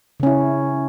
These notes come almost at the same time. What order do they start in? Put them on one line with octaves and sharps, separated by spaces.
C#3 C#4 E4